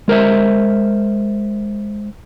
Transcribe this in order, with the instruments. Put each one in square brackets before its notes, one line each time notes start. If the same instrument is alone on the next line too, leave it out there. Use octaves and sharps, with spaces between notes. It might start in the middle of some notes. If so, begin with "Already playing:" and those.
[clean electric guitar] G#3 A#4 C5 E5